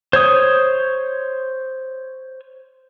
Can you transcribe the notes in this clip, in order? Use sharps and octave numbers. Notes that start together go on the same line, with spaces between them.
C5 C#5 D#6